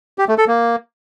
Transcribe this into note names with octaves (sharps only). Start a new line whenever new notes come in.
G4
A3
A4
A#3